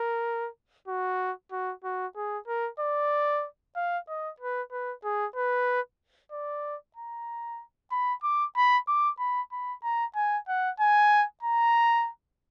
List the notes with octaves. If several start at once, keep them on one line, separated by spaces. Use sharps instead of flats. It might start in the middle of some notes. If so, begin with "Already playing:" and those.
Already playing: A#4
F#4
F#4
F#4
G#4
A#4
D5
F5
D#5
B4
B4
G#4
B4
D5
A#5
B5
D6
B5
D6
B5
B5
A#5
G#5
F#5
G#5
A#5